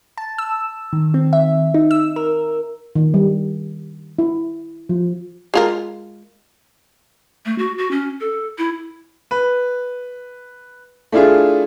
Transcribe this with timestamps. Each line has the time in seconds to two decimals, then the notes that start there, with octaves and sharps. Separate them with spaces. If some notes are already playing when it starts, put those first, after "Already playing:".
0.18 A5
0.38 E6
0.93 D#3
1.14 C4
1.33 E5
1.74 D#4
1.91 E6
2.16 A#4
2.96 D#3
3.14 G3
4.19 E4
4.89 F3
5.54 G#3 F4 A#4
7.46 A3
7.58 F#4
7.78 F#4
7.91 C#4
8.21 A4
8.58 E4
9.31 B4
11.12 A3 D4 E4 F4 G#4